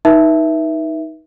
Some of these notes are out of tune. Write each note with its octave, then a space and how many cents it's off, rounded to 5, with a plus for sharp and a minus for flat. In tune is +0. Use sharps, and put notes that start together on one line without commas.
D#4 +15 B4 -40 E5 +0